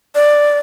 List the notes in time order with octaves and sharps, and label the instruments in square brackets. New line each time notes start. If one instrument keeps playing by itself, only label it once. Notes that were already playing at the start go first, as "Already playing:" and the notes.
[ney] D5